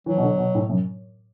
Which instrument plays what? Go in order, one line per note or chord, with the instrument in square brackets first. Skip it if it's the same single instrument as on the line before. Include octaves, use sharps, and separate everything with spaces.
[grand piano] E3 [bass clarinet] F#3
[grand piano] B2
D3
B2
A2
F#2